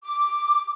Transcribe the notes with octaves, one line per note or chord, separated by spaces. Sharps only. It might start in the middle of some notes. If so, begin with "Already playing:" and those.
D6